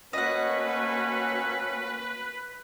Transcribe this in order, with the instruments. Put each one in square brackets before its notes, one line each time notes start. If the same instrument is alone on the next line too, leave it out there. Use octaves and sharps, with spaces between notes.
[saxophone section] A3 C4 C#4 [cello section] A#3 F#4 [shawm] B4 [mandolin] D#5 F#5